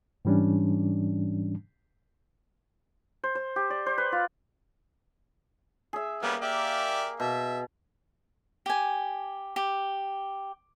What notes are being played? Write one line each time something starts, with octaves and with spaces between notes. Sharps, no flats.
G#2 E3 G3 C#4 D4
C5
C5
G4
D5
C5
B4
F4
G#4 E5
G3 A#3 B3 C#4
G4 D5 E5
B2 E5
G4 G#5
G4